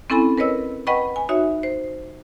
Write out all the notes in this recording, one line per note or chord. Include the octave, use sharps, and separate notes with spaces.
C4 C#4 E4 A4 G#5 B5
A#4 B4 C#5 D#5 E6
B4 D#5 F#5 G5 B5 C#6
G#5
D#4 F#4 C#5 E5
C5